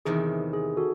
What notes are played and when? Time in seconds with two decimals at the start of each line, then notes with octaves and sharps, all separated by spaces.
0.05 E2 C3 D#3 G#4
0.53 G#4
0.77 F#4 A4